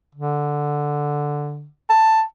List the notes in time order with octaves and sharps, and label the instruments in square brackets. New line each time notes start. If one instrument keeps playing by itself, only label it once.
[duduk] D3
[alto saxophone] A5